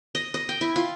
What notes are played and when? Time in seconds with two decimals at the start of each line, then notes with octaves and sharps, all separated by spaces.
0.15 D#5
0.34 D#5
0.49 G5
0.61 E4
0.76 F4